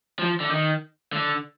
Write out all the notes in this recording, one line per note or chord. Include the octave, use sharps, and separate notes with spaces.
F3
D3
D#3
D3